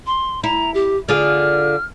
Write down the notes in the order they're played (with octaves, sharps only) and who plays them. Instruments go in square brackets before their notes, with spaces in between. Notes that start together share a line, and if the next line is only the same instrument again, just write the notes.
[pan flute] C6
[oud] E4 [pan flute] A#5
[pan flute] G4
[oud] D3 F4 G#4 [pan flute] F6